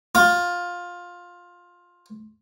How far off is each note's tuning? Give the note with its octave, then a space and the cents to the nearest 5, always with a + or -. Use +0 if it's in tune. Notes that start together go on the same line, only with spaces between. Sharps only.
F4 +15